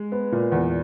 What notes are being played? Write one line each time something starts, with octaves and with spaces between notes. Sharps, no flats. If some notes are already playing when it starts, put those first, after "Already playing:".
Already playing: G#3
B3
A#2
E2